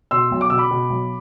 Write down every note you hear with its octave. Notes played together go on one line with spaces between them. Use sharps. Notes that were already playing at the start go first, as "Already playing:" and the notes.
B2 C6 E6
B1
D6
B2 E6
B5 D6
B2
B1